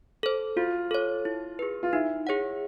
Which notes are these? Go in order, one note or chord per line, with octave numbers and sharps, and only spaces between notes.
A4 C5
F4 F#4
A4 C#5
E4
G#4 B4
F4
D#4 E4
G#4 C#5 F#5